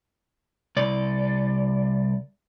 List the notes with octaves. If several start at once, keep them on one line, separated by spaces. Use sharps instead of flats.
C2 D5